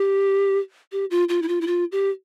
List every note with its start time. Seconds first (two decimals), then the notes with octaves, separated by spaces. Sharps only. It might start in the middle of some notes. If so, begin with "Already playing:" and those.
Already playing: G4
0.92 G4
1.11 F4
1.29 F4
1.42 E4
1.48 F4
1.61 E4
1.67 F4
1.92 G4